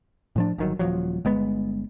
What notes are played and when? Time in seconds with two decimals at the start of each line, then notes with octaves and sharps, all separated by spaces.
0.36 A2 F3 D4
0.58 G1 D#3 F#3
0.79 D#1 F3 F#3
1.25 G1 G#3 B3